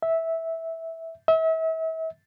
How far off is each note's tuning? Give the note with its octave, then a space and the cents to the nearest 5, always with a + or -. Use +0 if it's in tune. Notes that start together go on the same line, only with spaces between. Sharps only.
E5 -10
E5 -35